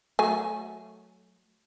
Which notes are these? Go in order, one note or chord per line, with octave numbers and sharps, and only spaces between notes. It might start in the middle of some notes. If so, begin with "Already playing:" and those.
F#3 A3 G#5